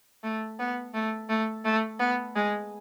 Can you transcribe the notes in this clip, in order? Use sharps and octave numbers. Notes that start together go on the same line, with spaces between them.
A3
B3
A3
A3
A3
B3
G#3